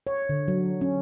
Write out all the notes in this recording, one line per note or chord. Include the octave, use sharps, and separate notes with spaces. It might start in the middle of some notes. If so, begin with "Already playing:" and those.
C#5
D3
F#3
C#4